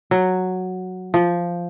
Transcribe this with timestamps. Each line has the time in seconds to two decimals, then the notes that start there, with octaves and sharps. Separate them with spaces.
0.11 F#3
1.14 F3